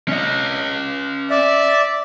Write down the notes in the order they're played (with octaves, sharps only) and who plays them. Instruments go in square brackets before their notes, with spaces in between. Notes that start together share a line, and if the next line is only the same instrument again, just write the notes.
[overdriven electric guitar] C#4 D#5
[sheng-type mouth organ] D5 E5